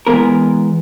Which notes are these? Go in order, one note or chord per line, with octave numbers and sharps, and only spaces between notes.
E3 G#3 B3 A#4